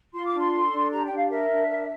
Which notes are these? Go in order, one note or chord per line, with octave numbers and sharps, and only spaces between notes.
F4 C6
D6
D4
C6
A4
D4
G4 A#5
G5
D4
F5
A#4 E5
D4
A#4